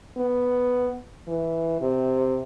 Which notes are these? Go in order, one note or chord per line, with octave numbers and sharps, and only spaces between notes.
B3
E3
C3